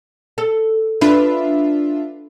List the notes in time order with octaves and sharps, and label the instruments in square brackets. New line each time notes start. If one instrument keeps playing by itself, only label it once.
[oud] A4
[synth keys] D4 F4 E5 [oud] B4